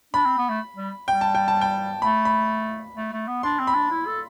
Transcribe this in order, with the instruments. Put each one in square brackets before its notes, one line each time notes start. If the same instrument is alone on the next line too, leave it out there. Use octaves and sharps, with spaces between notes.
[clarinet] D4 [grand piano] B5
[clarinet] C4
B3
A3
G3
[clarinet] G3 [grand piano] G5
[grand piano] A5
G5
A5
G5
[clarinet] A3 [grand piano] B5
[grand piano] B5
[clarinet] A3
A3
B3
[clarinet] D4 [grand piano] C6
[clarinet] C4
[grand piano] B5
[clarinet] D4
E4
A4